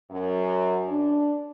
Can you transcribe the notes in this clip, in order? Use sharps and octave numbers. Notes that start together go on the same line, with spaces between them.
F#2
D4